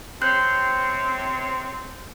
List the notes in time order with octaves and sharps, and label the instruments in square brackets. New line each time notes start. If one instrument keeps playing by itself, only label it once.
[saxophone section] C3 C4 C#5 [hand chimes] F#6 G6